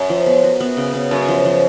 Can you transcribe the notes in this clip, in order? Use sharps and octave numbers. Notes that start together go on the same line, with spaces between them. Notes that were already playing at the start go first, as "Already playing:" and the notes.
Already playing: F#2
F3
B3
F#4
B3
C#3
B3
F#2 F#4
F3
F3